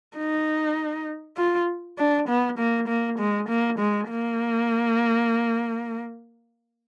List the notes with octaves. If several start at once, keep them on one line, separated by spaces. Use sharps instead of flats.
D#4
F4
D4
B3
A#3
A#3
G#3
A#3
G#3
A#3